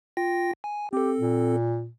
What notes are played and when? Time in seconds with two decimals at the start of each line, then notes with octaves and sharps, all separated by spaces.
0.17 F4 G5 A#6
0.64 G#5
0.93 C4 G4 A4
1.19 A#2